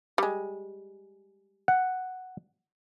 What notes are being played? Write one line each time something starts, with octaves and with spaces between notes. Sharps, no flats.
G3 G#3
F#5